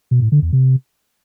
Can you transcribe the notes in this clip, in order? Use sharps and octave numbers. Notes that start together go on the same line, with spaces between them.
B2
A2
D3
E2
C3